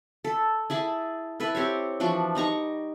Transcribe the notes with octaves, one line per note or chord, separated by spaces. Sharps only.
A4
E4 G#4 A5 B5
E4 A4 B4
C4 G4 C5 C#5
E3 F3 D4 F#4
G3 D#4 A#5 C#6